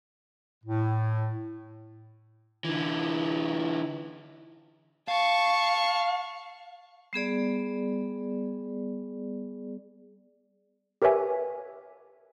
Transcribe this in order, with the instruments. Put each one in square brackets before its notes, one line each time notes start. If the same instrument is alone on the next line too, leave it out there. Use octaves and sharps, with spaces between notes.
[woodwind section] A2
[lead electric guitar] D3 E3
[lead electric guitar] F5 [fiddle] A5 C#6
[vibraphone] G3 B3 G#4 D5
[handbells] G4 A#4 B4 C#5 E5 G#5